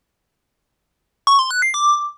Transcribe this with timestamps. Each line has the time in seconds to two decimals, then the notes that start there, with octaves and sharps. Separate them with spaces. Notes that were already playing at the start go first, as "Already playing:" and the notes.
1.27 C#6
1.39 C6
1.51 F#6
1.62 C7
1.74 D6